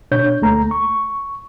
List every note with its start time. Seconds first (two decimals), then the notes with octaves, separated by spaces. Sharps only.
0.11 B2 D4 C#5 G6
0.42 D2 A3 A#5
0.71 C#6